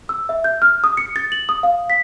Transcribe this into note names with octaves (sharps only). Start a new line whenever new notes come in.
E6
E5
G6
F6
D#6
C#7
A6
F#7
D#6
F5
B6